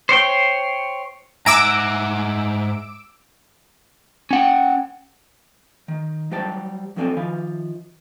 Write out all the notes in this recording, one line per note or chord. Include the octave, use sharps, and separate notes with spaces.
C5 C#5 G5
G#2 E5 F#5 G#5 A#5 D6 E6 D7
C#4 F#5 G5
D#3
F#3 G3 C5 G5 A5
F2 F#3 C4 A4 D5 G#5
D#3 F3 F5 G#5 B5